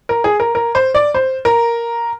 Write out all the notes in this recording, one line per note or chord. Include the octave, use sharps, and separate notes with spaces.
A#4
G#4
A#4
A#4
C5
D5
C5
A#4